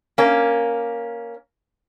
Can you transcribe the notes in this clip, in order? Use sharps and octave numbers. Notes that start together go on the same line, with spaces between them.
A#3 C#4